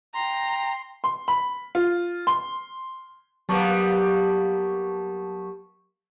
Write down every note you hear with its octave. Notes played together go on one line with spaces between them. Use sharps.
G5 A#5 C6
C6
B5
F4
C6
F#3 G3 A#3 B3 A5 C#6